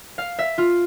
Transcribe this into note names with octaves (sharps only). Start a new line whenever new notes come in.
F5
E5
F4